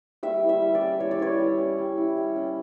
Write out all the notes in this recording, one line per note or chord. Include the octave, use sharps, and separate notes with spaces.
G3 E5
E4
E5
G3
D5
C#4
G3 C#5
D5
E4 C#5
G3
C#4
G3
E4
G3
C#4